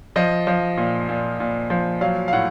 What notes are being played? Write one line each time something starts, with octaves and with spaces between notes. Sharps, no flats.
F3 D#5
F3
A#2
A#2
A#2
F3
F#3 F5
F5
A2 F#5